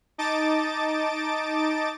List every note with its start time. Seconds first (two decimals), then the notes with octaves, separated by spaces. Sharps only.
0.18 D#4 D#5 A5 D6 A6 D7